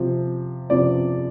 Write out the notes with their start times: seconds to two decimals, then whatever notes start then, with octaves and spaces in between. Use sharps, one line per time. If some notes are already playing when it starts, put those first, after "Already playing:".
Already playing: C3 F3
0.70 C3 F3 D5